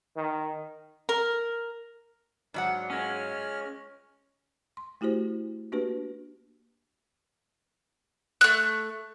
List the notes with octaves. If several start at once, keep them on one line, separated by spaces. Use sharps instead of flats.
D#3
A#4
G#2 F#3 D4 F#5
G#3 C#4 C#5 F6
C6
A3 E4 F#4 G4 C5
A#3 D4 F#4 G4 B4
A3 F#6